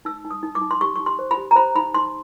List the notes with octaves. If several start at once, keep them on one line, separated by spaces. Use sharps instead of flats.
D#4 E6
D#4
D#6
D#4
D6
D#4
C6
G4 C#6
D#4 C#6
C6
C5
B5
G4
A#5
C5 B5
D#4 B5
D#4 C6